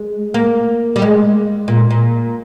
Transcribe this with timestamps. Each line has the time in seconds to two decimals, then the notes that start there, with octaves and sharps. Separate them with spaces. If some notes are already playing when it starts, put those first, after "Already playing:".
Already playing: G#3
0.34 A#3
0.96 G3
1.02 G#3
1.68 A#2
1.91 A#2